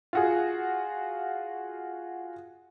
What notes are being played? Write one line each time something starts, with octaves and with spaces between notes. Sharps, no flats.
F4 F#4 G#4